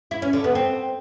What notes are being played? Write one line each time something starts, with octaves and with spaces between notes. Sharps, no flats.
E4
C#4
D3
B3
C4